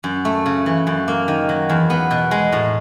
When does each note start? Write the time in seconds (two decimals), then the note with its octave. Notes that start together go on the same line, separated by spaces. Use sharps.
0.04 F#2
0.25 A3
0.46 C#3
0.66 E3
0.87 F#2
1.08 A#3
1.28 D#3
1.49 F#3
1.70 E2
1.90 B3
2.11 B2
2.31 G#3
2.52 A2